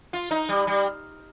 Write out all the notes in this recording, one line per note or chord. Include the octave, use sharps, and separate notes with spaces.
F4
D#4
G3
G3